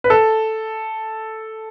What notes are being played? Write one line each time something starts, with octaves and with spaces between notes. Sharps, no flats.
B4
A4